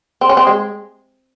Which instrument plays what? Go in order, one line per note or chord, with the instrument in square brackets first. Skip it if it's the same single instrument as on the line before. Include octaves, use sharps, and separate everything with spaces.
[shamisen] C4
C#4
C4
G#3